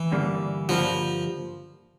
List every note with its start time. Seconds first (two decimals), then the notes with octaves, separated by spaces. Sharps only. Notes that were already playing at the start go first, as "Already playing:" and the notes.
Already playing: E3
0.12 G2 D3 G3 A#3
0.69 G2 D3 F3 G3 A#3